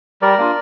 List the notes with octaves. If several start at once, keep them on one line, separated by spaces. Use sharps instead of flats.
G3 A#4 D5
A#3 D4 F4